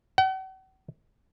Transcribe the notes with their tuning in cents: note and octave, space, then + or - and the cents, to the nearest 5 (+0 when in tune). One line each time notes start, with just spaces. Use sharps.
F#5 +45